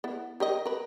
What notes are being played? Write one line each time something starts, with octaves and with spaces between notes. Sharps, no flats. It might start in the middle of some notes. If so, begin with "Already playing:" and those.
B3 E4
G4 A#4 D#5
A#4 B4